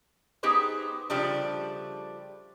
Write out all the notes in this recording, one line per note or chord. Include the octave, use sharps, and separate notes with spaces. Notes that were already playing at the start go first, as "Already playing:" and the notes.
B3 D#4 G4 G#4 B4 C5
C#3 F3 G3 A3 D4